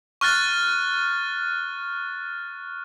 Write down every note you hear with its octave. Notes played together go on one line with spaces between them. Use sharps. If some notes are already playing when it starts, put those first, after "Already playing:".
C#6 F6 F#6 A6